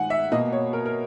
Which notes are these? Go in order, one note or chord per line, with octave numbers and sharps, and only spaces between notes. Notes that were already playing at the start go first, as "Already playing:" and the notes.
Already playing: D#3 G#3 F#5 G#5
E5
B2 A#3 D#5
C#5
A#4
A#4